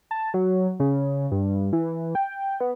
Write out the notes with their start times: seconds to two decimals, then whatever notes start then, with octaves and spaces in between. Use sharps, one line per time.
0.11 A5
0.34 F#3
0.80 C#3
1.32 G2
1.73 E3
2.15 G5
2.60 B3